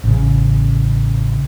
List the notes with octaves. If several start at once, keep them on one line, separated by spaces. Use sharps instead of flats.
A1 C#3